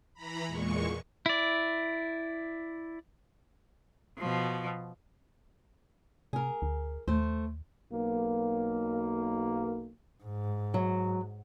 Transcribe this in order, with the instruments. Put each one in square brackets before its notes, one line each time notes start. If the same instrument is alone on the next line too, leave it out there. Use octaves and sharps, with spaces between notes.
[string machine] E3 A#5 B5
E2 A#2 G#3 C#6
[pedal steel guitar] E4 D5
[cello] B2 F3
[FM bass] C3 [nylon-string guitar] G#4 A#4
[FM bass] D2
[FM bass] D#2 [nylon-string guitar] A3 C5
[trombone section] B1 A#3
[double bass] G#2
[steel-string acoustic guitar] F#3